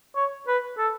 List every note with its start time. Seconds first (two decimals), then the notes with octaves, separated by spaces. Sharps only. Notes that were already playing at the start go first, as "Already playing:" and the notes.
0.16 C#5
0.48 B4
0.78 A4